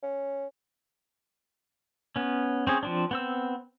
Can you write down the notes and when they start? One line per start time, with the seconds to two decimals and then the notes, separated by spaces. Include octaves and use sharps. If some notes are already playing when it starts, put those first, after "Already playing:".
0.03 C#4
2.16 B3 C#4
2.67 C4 C#4 G#4
2.83 F3 C4 D4
3.11 B3 C4 E6